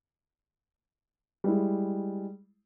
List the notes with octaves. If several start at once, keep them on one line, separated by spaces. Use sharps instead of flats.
G3 G#3 E4